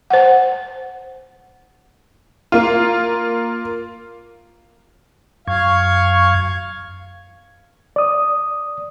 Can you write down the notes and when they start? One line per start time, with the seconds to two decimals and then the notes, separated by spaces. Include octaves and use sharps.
0.10 C5 F#5
2.52 A#3 F4
5.47 F#2 F5 C#6 G#6
7.96 D5 D#6